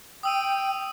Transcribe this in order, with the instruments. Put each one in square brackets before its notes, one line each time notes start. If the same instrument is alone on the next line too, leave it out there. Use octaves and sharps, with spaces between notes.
[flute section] G5 [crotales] D#6 E6 D#7